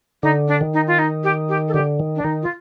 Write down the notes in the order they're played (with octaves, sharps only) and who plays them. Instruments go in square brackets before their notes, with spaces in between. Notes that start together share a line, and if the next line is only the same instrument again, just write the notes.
[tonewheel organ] D3 [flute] D#4
[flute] D4
[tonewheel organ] D#3
[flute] D#4
F4
D#4
G4
G4
A4
[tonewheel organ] D3 [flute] G4
[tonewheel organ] D#3
[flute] D4
[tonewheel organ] D#3 [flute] D#4
[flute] F4